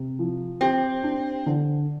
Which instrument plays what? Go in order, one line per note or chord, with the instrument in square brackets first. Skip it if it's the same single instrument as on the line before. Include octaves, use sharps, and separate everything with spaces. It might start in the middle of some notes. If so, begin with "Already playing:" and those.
Already playing: [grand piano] C3
F3
[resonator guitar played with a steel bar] C4 [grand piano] G4
[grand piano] D4
D3